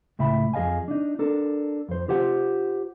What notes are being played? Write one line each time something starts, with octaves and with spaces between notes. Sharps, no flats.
C#2 A2 E5 G5 B5
F2 G#4 D#5 F5 G#5
D4 D#4
D4 A4 A#4
F2 C5
F4 G4 C5 F#5